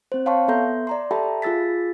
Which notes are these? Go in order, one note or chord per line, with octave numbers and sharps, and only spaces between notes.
C4 C5
C#5 F5 G5 A5 C6 C#6
B3 A4 E5 A#5 C6 G6
D5 A#5 C6
G4 A4 E5 G5 A5 B5
F4 G#4 E6 A6 B6